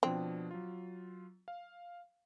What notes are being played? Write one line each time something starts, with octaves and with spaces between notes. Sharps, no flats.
B2 F3 C4 D4
F#3 F4
F5